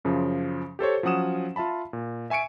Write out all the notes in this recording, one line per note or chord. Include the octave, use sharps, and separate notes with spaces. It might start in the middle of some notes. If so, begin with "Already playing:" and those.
F#2 C#3 F3
G4 A4 C5 C#5
F3 F#3 C#4 F#5 D#6 E7
F4 E5 A5 B5
A#2
E5 G#5 C#6 C#7 D7